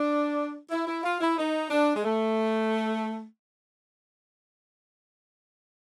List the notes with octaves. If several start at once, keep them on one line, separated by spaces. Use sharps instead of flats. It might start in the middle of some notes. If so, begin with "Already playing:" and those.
Already playing: D4
E4
E4
F4
E4
D#4
D4
G#3
A3